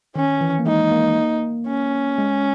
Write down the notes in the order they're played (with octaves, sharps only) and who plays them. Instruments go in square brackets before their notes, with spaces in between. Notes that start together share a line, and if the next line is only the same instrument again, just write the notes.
[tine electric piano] D#3 [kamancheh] C#4
[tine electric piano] E3
A#3
[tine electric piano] G#3 [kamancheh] D#4
[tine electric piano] A#3
[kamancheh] C#4
[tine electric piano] G#3